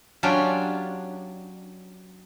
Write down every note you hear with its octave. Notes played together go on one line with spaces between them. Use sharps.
F#3 C#4 D4 F4 G4